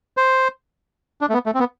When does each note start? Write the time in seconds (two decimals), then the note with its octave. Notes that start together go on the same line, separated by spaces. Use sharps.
0.17 C5
1.21 D4
1.29 A3
1.34 B3
1.46 A3
1.54 C4
1.60 B3